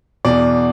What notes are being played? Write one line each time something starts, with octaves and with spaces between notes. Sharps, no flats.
E2 B2 D5